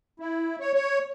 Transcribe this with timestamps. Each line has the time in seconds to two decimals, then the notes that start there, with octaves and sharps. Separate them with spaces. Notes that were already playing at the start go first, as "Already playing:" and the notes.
0.20 E4
0.60 C#5
0.75 C#5